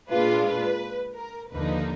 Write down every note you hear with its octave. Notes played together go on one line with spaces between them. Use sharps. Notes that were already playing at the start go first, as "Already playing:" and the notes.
A#2 G#3 D4 F4 B4
B4
A#4
D#2 D3 F3 A#3 D#4 B4